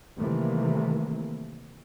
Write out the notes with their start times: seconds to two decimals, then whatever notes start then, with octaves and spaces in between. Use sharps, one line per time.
0.17 C3 D#3 E3 G3 A3 A#3